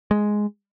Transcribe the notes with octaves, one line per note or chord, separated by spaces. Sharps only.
G#3